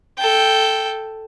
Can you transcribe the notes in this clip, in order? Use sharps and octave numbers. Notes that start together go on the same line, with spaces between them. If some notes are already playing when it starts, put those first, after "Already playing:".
A4 G5